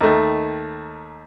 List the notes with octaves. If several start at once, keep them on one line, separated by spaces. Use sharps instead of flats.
D#2 D#3 A3